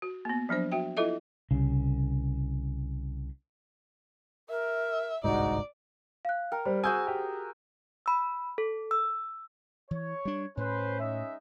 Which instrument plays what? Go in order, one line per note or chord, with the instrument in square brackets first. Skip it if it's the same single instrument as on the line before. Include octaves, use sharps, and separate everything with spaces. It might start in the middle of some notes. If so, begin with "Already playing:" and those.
[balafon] F#4
A#3 B3
F3 F#3 D4 C5
F#4 E5 G5
E4 F4 A4 D#5 E5
[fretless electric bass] C2 C#3
[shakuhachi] A#4 [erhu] E5
[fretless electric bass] G1 C2 G#2 [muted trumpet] D#4 [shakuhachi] F#4 [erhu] D5
[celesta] F5 F#6
[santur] A#4 [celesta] G5
[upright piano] G3 [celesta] C5
[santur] F#4 G#4 E5 [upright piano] G#5 G6
[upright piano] G4
[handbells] B5 E6
A4
E6
[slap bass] E3 [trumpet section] C#5
[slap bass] G3 D4
[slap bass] A2 [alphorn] C#4 [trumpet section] B4 C5
[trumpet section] G#3 D#4 E5